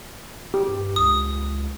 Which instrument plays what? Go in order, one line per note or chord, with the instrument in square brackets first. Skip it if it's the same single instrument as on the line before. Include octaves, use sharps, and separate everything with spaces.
[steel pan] G4
[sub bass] G2
[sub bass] C#2 [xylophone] D#6